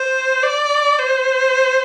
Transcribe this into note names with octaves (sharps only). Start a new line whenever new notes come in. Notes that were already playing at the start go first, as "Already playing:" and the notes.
Already playing: C5
D5
C5